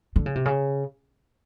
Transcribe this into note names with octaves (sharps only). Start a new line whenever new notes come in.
D3
C#3
C3
C#3